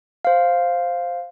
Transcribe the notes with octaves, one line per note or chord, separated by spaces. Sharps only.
C5 F5